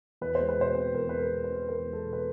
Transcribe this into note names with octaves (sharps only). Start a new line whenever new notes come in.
E2 B4
G#3 C5
B4
B2 C5
C4 B4
E2 A#4
G#3 B4
A#4
B2
B4
C4
B4
E2 A#4
G#3
A4
B2
B4